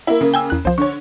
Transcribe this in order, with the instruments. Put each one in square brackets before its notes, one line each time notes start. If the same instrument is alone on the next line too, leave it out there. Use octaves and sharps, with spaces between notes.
[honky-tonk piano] A#3 E4
C#3 A#3
[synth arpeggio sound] G5 G#5 E6
E2 F#6
[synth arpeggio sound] C2 F3 [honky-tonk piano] C5
[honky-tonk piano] D3 C#5 [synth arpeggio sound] C#6